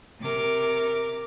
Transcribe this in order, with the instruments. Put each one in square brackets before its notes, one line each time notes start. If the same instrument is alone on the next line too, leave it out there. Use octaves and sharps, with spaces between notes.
[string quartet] C3 A#4 D6